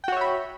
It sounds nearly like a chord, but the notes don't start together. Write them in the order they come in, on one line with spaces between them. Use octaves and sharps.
G5 F#4 C#5 E5 B5